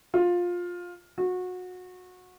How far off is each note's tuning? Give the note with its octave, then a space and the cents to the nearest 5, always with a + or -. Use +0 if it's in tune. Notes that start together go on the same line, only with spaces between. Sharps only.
F4 +15
F#4 -25